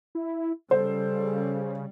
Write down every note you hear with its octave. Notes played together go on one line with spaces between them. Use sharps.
E4
C#3 G3 A4 C5